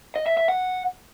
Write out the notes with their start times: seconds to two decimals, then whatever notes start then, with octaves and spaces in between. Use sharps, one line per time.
0.16 D#5
0.27 E5
0.37 E5
0.48 F#5